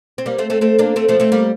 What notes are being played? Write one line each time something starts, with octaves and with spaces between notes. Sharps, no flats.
C4
G3 A#3
A3 C4
A3 C4
A3 C4
A#3 D4
A3 C4
F3 A3
A3 C4
G3 A#3